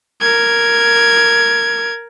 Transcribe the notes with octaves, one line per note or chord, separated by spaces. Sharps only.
A#4 G#6